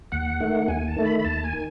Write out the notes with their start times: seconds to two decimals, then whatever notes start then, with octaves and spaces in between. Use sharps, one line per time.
0.12 D#2 F#5
0.40 D#3 A3
0.68 D#2 G#5
0.88 A5
0.96 D#3 A3
1.05 B5
1.19 B5
1.24 D#2 A5
1.44 G#5
1.53 D#3